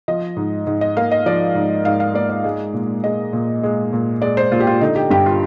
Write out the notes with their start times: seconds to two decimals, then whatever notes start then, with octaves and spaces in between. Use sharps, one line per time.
0.08 F3 D#5
0.36 G#2
0.67 G#2
0.81 D#5
0.97 A#3 F5
1.11 D#5
1.26 F3 D5
1.55 G#2
1.85 G#2 F5
2.00 F5
2.14 A#3 D5
2.29 D5
2.44 G#3
2.74 A#2
3.04 G#3 D#5
3.33 A#2
3.63 G#3
3.93 A#2
4.22 G#3 D5
4.37 C5
4.52 A#2 F4
4.60 G4
4.67 F4
4.81 D3 D#4
4.96 G4
5.10 G2 G4
5.26 F4